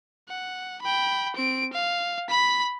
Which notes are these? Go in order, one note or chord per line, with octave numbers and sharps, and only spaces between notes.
F#5
G5 B5
C4 D7
F5
B5 B6